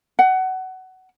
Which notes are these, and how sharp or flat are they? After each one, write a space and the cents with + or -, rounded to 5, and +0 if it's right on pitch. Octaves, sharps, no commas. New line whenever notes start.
F#5 +20